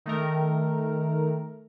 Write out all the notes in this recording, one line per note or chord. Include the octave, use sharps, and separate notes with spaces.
D#3 A3 A#4